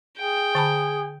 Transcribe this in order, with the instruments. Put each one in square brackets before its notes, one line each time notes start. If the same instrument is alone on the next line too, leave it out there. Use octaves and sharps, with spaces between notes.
[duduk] G#4 [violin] G5
[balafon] D3 A5 B5